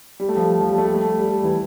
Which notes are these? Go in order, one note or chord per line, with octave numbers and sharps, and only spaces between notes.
G3
A3
F3
F3
G3
A3
G3
A3
G3
E3